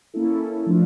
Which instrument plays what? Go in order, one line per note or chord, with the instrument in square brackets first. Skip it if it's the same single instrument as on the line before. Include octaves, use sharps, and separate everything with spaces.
[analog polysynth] A#3 C#4 E4 A4
F3 A3 D4 F4